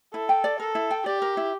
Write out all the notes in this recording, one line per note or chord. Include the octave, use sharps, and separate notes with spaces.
E4 A4
G5
D5
A4 A#4
E4
G5
G4 D5
A#4
E4